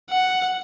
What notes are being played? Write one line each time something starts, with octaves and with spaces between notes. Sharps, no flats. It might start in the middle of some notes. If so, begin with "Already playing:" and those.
F#5